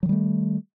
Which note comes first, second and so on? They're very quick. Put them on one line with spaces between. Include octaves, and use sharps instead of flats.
F#3 D#3 G3 A3